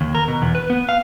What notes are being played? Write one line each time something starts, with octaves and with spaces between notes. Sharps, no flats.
D#2
A#4
B2
E2
B4
B3
F5